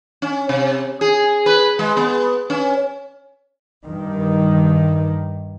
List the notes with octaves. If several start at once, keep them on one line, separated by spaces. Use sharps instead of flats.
C#4
C3
G#4
B4
G#3
B3
C#4
G2 D#3